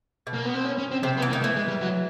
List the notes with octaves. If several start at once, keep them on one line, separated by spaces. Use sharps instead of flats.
B2
A#3
B3
C4
C#4
C#4
C4
C3 C4
B3
E3
A#3
D#3
E3 A3
G#3
G3
F#3